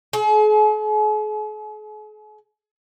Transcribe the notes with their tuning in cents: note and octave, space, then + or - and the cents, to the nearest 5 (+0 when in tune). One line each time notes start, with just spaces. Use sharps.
G#4 +45